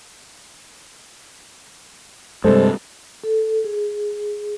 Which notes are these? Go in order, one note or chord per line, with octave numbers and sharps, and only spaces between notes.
G2 C3 G3 G#3 A4 C5
A4
G#4